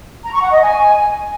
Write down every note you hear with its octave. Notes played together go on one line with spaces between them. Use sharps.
A#5
C#6
F#5
D#5
G#5